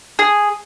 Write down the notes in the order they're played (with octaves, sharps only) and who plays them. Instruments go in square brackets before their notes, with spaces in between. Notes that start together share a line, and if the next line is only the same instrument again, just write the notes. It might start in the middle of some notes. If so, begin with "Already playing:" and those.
[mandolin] G#4